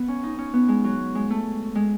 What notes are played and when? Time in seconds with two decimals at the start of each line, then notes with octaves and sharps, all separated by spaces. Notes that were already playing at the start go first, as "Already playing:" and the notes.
Already playing: B3
0.08 C#4
0.23 D#4
0.38 C#4
0.54 B3
0.68 G#3
0.84 F#3
1.15 G#3
1.30 A3
1.75 G#3